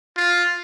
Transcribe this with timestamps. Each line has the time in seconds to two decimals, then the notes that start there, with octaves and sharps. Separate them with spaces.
0.16 F4